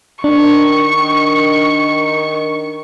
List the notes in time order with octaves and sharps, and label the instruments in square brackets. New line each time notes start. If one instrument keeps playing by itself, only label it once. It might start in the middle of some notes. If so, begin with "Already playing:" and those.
[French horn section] D#3 [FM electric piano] D4 [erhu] C#6